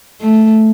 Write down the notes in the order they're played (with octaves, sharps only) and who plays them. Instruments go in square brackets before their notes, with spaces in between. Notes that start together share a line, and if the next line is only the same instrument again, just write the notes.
[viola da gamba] A3